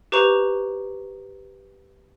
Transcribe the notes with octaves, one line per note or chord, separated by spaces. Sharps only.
G4 B4 C5 A#5 C#6 F7